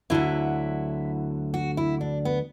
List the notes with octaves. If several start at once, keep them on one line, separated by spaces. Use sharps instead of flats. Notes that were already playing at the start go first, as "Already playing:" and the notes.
D2 D3 F#3 E4
F#4
E4
D4
B3